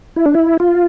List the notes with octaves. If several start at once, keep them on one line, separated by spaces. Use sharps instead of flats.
E4
D4
E4
F4